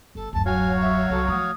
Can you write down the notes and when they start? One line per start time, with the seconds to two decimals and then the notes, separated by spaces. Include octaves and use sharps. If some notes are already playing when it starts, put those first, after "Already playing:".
0.15 G1 A4
0.33 D1 F#2 A5
0.46 F#3 F#4 C#5 F5 G#5
0.81 E5
1.10 C2 A4
1.28 F3 A3 D#6